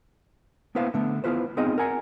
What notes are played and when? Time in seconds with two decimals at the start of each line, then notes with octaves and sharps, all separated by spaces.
0.75 A#3 B3 E4 B4 C5 F5
0.94 D3 A3 B3
1.24 B3 E4 F4 B4 C5
1.57 B3 C4 D#4 F4 G#4 D#5
1.78 A#4 F#5 G#5 A#5